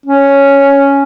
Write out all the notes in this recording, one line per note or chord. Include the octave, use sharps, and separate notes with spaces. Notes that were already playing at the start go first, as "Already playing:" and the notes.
C#4